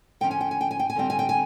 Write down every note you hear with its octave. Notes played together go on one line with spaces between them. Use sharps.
D3 F3 G#3 C#4 G5
G#5
G5
G#5
G5
G#5
G5
G#5
D3 G3 C4 G5
G#5
G5
G#5